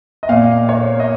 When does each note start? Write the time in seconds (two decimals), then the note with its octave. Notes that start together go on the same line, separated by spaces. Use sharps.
0.23 D#5
0.29 A#2 F5
0.69 C#5
1.00 D#5